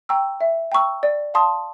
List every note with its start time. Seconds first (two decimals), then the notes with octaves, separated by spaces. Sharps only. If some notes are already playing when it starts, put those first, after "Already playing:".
0.09 G5 A#5 C#6 E6
0.41 E5
0.72 G5 A#5 C#6 E6
1.03 D5
1.34 F5 A5 C6 D#6